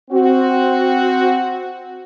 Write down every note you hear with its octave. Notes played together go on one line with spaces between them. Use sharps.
C4 F#4